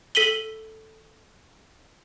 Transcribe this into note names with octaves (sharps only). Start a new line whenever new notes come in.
A4 B6 D#7 F#7 G7